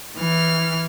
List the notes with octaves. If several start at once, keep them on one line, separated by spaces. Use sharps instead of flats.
E3 F6